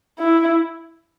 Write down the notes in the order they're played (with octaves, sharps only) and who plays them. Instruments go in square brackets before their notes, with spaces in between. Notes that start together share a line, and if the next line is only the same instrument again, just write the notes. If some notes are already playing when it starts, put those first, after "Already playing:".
[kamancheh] E4